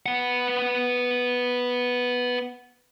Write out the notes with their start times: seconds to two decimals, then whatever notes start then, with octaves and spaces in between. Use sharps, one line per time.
0.06 B3 F#5